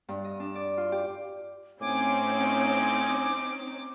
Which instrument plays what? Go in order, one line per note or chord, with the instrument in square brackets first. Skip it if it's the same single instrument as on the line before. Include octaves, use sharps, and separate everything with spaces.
[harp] G2
D#5
D4
D5
F4
G4
[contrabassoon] A2 [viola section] C4 C#4 D#4 [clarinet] G#5 [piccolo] D6